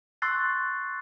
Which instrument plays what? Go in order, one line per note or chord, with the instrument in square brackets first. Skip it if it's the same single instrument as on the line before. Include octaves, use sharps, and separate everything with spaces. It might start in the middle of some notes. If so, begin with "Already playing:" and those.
[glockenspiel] C6 C#6 E6 F#6 A6 C7